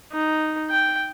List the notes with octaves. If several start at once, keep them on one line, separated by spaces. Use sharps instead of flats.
D#4
G5